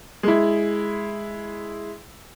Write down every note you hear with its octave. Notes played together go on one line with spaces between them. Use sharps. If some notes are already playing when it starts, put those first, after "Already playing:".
G#3 E4